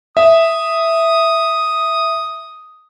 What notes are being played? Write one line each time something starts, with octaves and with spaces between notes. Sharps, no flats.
E5 D#6